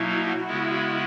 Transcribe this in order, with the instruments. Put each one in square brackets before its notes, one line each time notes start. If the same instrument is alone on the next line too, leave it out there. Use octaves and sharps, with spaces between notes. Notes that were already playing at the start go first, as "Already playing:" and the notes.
Already playing: [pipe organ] B2 F#3 A#3 D#4 [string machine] E4
[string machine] F#4
[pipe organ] C#3 G#3 B3 E4